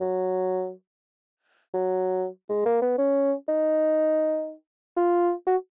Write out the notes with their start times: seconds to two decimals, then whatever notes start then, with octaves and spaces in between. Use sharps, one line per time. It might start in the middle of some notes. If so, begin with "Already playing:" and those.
0.01 F#3
1.74 F#3
2.49 G#3
2.65 A#3
2.82 B3
2.98 C#4
3.48 D#4
4.97 F4
5.47 F#4